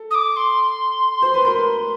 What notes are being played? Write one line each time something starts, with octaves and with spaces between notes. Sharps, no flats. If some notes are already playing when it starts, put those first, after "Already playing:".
Already playing: A4
D#6
D6
C6
C5
B4
A#4
B4